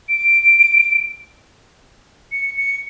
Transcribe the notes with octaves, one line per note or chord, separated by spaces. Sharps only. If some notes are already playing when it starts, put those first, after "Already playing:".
D7
C#7
C#7